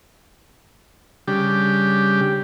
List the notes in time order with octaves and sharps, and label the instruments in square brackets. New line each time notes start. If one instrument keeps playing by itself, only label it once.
[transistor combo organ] C#3 G3 D4 G4